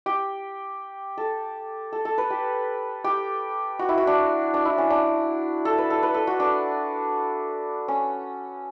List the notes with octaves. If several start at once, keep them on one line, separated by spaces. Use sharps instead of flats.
G4
A4
A4
A4
B4
G4
G4
F#4
E4
F#4
D4
D4
E4
C#4
D4
A4
B4
A4
B4
A4
F#4
D4
C#4